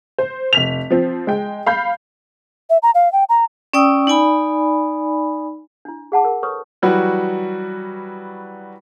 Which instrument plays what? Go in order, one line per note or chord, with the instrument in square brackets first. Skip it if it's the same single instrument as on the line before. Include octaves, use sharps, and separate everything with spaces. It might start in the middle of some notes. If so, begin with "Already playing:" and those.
[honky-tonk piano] C5
F1 B6 F7
F3 C4
G#3 G5
F5 B5 G6
[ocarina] E5
A#5
F5
G5
A#5
[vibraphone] C#4 D5 G5 D#6 E6
D#4 D5 G#5 B5
[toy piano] D4 E4
G#4 F#5 A5 D6
A#4
A4 B4 C#5 C#6 D#6
[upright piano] E3 F#3 G3 F#4 B4